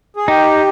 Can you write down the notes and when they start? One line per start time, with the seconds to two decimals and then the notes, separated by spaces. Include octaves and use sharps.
0.16 G#4
0.28 D#4 G4